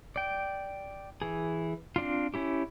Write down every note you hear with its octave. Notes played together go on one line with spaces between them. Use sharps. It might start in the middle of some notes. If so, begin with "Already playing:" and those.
D5 G5
E3 G#4
C4 D4 F4
C#4 E4 G4